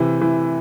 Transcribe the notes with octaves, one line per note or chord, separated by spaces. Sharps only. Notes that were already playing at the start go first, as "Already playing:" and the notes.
Already playing: C3 E3
E3